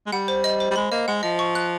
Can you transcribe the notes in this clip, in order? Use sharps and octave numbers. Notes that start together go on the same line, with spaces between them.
G#3
G3 F#5
C5
D#5
C5
G3
G#3 B5
A#3 D#5
G#3 F#5
F3 D#5
C#6
F#6